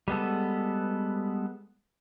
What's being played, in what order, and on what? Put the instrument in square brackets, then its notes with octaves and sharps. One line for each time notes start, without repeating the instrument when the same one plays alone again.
[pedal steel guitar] G3 G#3 B3 A4